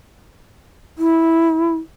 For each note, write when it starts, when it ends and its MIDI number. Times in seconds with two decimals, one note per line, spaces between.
0.98 1.76 64